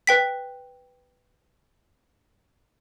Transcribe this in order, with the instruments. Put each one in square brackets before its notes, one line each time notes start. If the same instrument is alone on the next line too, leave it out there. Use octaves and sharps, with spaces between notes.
[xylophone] B4 G5 B6